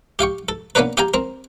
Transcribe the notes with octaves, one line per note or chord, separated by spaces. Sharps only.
G4 F5 G5 C#6
A4
A#3 B3 C#4 D4 A#4 B4
G4 G#4 F5 G5 G#5 A#5
C4 A#4